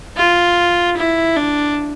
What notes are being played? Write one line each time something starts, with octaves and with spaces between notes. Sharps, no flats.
F4
E4
D4